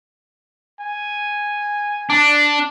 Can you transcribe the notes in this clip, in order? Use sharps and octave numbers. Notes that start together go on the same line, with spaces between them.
G#5
D4